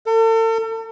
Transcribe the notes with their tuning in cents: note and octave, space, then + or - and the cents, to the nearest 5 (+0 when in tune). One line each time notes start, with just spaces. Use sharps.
A4 +40